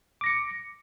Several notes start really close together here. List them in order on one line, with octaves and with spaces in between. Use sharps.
D6 A#6 C#7